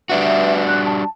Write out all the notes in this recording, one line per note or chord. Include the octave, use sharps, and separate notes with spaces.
G3 D4 F#4 B4 E5
F#6
A5